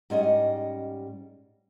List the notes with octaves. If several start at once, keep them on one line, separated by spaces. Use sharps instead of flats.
G#2 G3 C#4 D#5